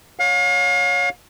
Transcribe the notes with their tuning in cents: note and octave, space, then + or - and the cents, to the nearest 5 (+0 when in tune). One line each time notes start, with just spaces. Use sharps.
C#5 +10 F5 +40